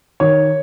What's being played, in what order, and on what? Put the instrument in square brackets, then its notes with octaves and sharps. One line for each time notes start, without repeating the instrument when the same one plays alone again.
[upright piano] D#3 C#5